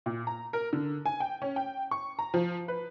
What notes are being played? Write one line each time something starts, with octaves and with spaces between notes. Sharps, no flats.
A#2
A#5
A#4
D3
G#5
G5
C#4
G5
C#6
A#5
F3
B4